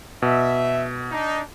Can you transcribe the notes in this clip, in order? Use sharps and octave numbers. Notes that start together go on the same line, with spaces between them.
B2 E5
D4 D#4